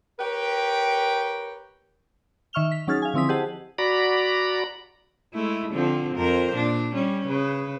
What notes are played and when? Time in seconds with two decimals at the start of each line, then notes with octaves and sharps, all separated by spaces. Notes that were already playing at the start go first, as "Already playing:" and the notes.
0.19 G4 A#4 B4 C#5 G5
2.53 D#3 E5 C#6 F6 F7 G7
2.71 B6
2.87 F#3 C#4 D#4 G#4 F6 A6
3.02 F5 G#5
3.14 D3 F3 C4 E4 D#6 B6
3.29 G4 G#4 C5 D#5 F#5 A5
3.79 F#4 D5 A#5 B5
5.34 G#3 A3 E4
5.72 D3 F3 C4
6.15 F2 A#4 C5
6.55 A#2 D4
6.94 G3 C#4
7.25 C#3 B4